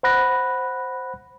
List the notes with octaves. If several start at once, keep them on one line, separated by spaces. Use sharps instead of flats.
C5 F#5 B5 F#6 A#6